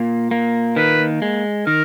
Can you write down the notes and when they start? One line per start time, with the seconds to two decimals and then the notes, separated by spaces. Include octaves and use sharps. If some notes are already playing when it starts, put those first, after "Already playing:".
Already playing: A#2 A#3
0.31 A#3
0.76 D#3 B4
1.22 G#3
1.67 D#3 A#4